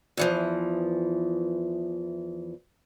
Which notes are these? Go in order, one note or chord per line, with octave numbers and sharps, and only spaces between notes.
E2 E3 F3